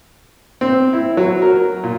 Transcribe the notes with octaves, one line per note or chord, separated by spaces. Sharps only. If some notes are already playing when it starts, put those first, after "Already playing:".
C4
E4
F#3
A#4
A#2